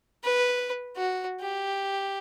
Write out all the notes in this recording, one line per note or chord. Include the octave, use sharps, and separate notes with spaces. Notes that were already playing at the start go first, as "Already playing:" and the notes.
B4
F#4
G4